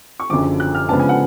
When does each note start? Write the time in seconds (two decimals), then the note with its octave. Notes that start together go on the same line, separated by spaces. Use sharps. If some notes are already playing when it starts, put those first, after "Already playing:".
0.20 C#6
0.30 F#1 F#2 D3 F3 D6
0.60 F#6
0.75 F6
0.89 C#3 F3 G#3 B3 D4 A5
1.00 G#5
1.09 F#5